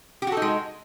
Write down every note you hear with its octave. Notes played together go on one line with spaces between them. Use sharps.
G#3 D#4 F#4 G4 A4